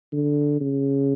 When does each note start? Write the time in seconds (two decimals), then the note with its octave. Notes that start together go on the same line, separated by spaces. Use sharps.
0.13 D3
0.61 C#3